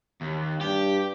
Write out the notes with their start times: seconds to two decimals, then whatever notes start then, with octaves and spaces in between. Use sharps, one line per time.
0.21 D#2
0.61 G2 G4